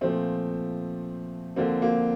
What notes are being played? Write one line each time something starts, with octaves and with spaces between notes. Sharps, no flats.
A#2 F3 A3 C4
D3 F3 A#3 C4
A#3